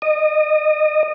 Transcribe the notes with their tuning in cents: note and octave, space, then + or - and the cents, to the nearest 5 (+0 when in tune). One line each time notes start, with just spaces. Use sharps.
D#5 -25